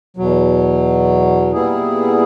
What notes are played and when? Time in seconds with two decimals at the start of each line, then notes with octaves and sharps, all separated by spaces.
0.17 E2 B2 F#3
1.52 A#2 G3 B3 E4 G#4